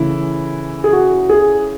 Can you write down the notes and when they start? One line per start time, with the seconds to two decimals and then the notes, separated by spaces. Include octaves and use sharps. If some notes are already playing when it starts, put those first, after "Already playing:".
Already playing: C#3 E3 A3 E4
0.84 G#4
0.93 F#4
1.29 G#4